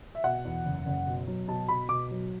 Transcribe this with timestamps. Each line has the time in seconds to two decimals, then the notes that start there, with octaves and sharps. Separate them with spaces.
0.15 E5
0.24 B2 F#5
0.45 E2
0.65 F#1
0.86 F#1
1.07 B2
1.27 F#3
1.48 B2 A5
1.68 B2 B5
1.89 B2 D6
2.11 F#3